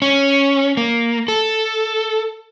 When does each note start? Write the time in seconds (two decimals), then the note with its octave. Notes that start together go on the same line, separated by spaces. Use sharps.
0.02 C#4
0.77 A#3
1.28 A4